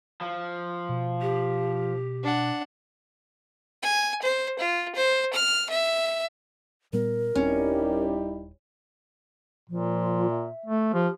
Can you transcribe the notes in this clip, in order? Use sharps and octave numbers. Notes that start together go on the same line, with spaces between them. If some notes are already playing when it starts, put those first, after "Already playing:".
F3
B2
G4
D4 F#5
G#5
C5
F4
C5
F6
E5
A#2 G3 B3 A#4
D#1 G3 C4 C#4 D#4 E4
A#2 F3
E5
A3
F3 G4